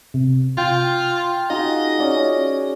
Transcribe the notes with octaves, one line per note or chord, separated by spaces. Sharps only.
C3
F4 G5
D#4 F4 F#4 G#4 D#5
C#4 D5 F#5